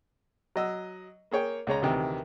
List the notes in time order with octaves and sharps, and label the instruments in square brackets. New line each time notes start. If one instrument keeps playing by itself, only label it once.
[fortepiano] F#3 D#5 E6
A#3 G#4 C#5 G5
C#2 G#3 C#5 A#5
D2 C3 D#3 E3